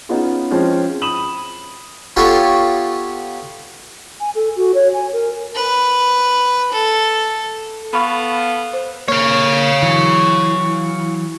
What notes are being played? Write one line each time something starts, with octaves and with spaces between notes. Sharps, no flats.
B3 C#4 D#4 F4 G#4
F3 G#3 C4 C#4 C5
B5 D#6 D#7 E7 F#7
B3 F4 G4 A4 C#5 G5
G#5
A4
F#4
C#5
G#5
A#4
B4
A4
B3 A4 F5 B5 C#6
C5
A#3 C#5 F5
E3 F#3